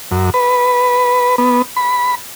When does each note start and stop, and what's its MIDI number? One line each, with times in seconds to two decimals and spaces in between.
0.11 0.30 42
0.34 1.36 71
1.38 1.62 59
1.76 2.15 83